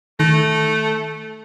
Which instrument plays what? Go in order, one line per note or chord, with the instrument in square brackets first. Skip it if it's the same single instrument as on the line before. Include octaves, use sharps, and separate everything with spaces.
[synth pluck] D#3 A#6 [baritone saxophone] A3